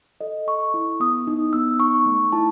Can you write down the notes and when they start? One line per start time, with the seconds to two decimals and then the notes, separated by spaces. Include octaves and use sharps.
0.21 A4 D#5
0.47 A4 C#6
0.74 E4
1.00 B3 D#6
1.27 D#4
1.53 B3 E6
1.80 D#4 C#6
2.06 A3
2.32 E4 A5